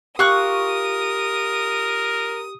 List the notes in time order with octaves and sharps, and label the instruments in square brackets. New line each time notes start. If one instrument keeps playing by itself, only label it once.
[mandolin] F4 C#6 F#6 [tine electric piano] G4 [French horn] A#4 [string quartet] D#6